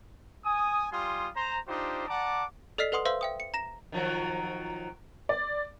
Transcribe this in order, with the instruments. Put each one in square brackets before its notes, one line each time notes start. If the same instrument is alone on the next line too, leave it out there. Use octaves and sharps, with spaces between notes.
[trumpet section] G#5 D#6
G3 F4 G#5 C6 D#6
C5 A#5
D4 D#4 F4 G4 C5
D5 F#5 A5 A#5 D6
[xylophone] A4 D5 D#5 F6 B6 C7
A4 B4 F#5 C6 D#6
B4 C5 E5 F5 C6 E6
E5 G5 D#6
C#7
A#5 A#6 E7
[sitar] D#3 F3 F#3
[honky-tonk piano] D5